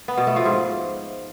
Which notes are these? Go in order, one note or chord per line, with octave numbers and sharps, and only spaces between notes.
B3
B2
A3
F3
G#2